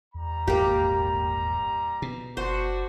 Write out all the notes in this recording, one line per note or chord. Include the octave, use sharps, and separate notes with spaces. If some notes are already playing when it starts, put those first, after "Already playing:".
E2 G3 A#5
D#1 G#1 A#3 G4
B2
F#1 D4 F#4 C5